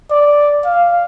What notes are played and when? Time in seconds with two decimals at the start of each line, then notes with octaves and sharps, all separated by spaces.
0.11 D5
0.65 F5